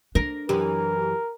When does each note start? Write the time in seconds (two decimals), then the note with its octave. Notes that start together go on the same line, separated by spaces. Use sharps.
0.15 D4 A#4
0.49 F#2 E3 G4 A#4